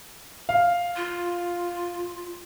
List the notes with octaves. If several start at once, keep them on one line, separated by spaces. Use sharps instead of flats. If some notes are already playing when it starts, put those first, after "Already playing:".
F5
F4